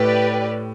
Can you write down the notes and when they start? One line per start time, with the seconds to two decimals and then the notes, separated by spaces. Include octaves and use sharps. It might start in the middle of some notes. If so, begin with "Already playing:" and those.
Already playing: A2 G4 B4 D5